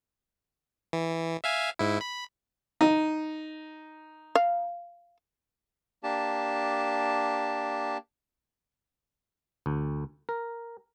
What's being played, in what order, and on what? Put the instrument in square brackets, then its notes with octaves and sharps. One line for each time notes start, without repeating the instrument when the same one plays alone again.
[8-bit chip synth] E3
E5 F5 G#5
G#2 E4
B5
[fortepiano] D#4
[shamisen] F5
[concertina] A#3 D4 G4 A5
[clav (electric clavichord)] D2
A#4